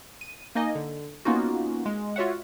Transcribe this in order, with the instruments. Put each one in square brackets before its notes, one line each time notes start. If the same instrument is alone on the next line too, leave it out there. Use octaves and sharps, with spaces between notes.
[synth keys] D#7
A#3 D#4 D#5 G#5
D3
A#3 B3 C#4 D#4 F4 F#4
G#3
F4 F#4 C#5 E5 F#5